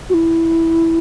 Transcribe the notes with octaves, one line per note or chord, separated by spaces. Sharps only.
F#4
E4